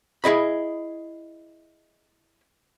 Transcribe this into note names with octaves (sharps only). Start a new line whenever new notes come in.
E4 G#4 D#5 B5